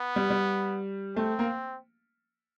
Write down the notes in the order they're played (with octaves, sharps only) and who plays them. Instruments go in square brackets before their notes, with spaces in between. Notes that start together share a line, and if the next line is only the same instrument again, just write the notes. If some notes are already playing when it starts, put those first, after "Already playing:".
Already playing: [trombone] B3
[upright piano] G3
G3
[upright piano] A3 [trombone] C4
[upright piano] A#3